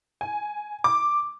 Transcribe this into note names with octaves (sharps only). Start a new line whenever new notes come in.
G#5
D6